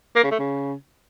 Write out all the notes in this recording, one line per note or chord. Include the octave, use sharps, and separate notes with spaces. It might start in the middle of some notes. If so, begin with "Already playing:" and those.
A#3
C#3
A3
C#3